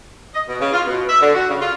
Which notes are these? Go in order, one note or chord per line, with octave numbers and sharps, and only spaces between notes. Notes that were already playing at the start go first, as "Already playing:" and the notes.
D#5
B2
C#3
F4
B2
E5
D3
F#4
C#3
F4